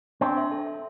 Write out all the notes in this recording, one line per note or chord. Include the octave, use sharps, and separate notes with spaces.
C4 D4
E5
A4
E5